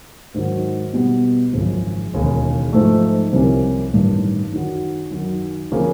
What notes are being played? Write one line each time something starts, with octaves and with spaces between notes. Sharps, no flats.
G#2 D#3 F#3
B2 G3 B3
G#1 F#2 C#3 F3
E1 D#2 C#3
G#2 F3 A3
C2 C3 F3 A#3 C#4
A1 G2 D#3
F#2 D#3 F#3
F#2 D#3 F#3
C#3 F3 A#3